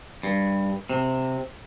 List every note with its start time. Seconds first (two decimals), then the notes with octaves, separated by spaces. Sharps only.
0.23 G2
0.90 C3